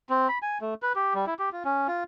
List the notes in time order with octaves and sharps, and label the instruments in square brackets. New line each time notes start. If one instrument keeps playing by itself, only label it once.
[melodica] C4
B5
G#5
A3
B4
G4
G3
E4
G4
F4
C#4
F4